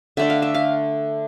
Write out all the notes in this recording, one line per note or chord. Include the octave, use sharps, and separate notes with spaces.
D3 A3 D4 E5
F5
E5
F5